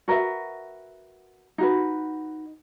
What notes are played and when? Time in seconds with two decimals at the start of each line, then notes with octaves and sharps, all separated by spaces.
0.08 F#4 A#4 B4 E5
1.58 D#4 F#4 B4